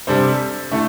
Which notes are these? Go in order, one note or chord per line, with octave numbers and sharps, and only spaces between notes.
C3 G3 D4 A4 C5
D3 A3 E4 A4